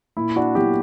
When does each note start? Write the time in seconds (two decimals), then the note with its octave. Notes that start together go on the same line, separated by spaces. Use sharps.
0.17 A#2 E4
0.36 D4 F#4
0.55 F#3 B3 D4 E4 G4